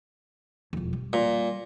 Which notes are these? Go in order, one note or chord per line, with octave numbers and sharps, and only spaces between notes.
E1 F2
G3
A#2